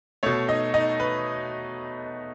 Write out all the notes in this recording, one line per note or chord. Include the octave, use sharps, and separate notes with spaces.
B2 A3 C#5
D#4 D#5
D#4 D#5
B4